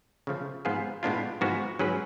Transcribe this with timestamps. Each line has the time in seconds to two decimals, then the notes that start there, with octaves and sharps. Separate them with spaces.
0.27 C#3 F3 A3
0.65 G#2 F3 B3 F4 G#4
1.03 A2 G#3 B3 D4 F4
1.41 G#2 F3 G#3 B3 F#4
1.79 G#2 F#3 C#4 G#4 B4